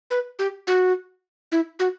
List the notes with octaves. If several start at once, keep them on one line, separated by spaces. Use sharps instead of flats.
B4
G4
F#4
E4
F#4